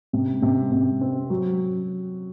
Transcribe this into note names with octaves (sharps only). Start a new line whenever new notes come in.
C3
C3
C3
C4
F#3